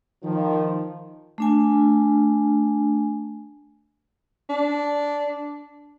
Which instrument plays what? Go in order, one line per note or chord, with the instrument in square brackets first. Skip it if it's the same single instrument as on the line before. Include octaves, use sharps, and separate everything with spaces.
[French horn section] D#3 F3
[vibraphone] A3 D4 G#5
[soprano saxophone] D4